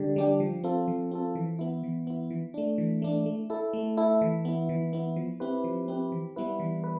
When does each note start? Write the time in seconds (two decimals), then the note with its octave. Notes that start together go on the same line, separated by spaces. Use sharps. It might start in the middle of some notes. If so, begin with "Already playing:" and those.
Already playing: D3 G3 D4 G4
0.16 G3 D4 G4
0.40 F3
0.64 C4 F4 A4
0.88 F3
1.11 C4 F4 A4
1.35 E3
1.59 B3 E4
1.83 E3
2.07 B3 E4
2.30 E3
2.54 A3 D4
2.78 E3
3.02 A3 D4
3.26 A3
3.50 E4 A4
3.73 A3
3.97 E4 A4
4.21 E3
4.45 B3 E4
4.69 E3
4.93 B3 E4
5.16 F3
5.40 C4 E4 G4 B4
5.64 F3
5.88 C4 E4 G4 B4
6.12 E3
6.36 G3 B3 E4 B4
6.59 E3
6.84 B4